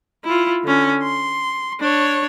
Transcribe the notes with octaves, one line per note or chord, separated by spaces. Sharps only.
E4 F4
D3 C#4
C6
D4 C#5